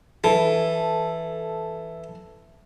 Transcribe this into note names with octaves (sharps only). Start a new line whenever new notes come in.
E3 A4